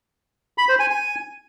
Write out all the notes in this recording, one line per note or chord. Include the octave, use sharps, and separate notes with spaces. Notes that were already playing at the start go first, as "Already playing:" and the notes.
B5
C5
G#5
G#5